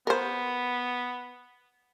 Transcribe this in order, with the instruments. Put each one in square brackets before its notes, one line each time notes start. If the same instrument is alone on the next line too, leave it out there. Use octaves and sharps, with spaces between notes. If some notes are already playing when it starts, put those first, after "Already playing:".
[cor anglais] B3 [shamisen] A#4 C5